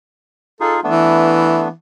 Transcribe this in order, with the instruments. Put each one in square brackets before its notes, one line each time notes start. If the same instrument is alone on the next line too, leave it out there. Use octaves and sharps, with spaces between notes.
[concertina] D#4 F4 G#4 [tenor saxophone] A4
[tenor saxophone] E3 [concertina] A3 B3 D4